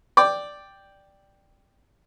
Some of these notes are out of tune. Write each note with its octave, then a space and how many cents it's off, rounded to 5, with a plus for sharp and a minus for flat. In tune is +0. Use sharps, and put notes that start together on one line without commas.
D5 +0 G5 +0